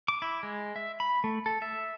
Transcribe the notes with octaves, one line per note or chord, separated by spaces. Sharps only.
D6
E4
G#3
E5
B5
A3
A4
E5